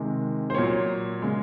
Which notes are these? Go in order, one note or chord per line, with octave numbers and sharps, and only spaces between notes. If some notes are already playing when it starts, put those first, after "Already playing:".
Already playing: C3 D#3 G#3
C5
A#2 F#3 A#3 C#5
C#3 G#3